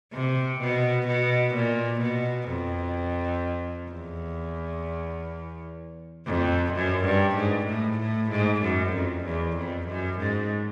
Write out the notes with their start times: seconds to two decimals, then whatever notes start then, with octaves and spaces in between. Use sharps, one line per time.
0.13 C3
0.60 B2
1.08 B2
1.55 A#2
2.01 B2
2.49 F2
3.90 E2
6.27 F2
6.73 F#2
7.05 G2
7.37 G#2
7.67 A2
8.00 A2
8.31 G#2
8.62 F#2
8.94 F2
9.24 E2
9.57 F2
9.88 F#2
10.19 G#2